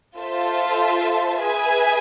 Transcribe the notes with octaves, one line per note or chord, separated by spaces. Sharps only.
F4 A4 C5 E5 A5
G#4 B4 E5 G#5